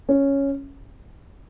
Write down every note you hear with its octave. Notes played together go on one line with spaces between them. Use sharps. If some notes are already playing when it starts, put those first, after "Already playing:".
C#4